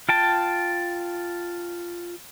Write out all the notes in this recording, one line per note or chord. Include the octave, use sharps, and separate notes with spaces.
F4 G5 A5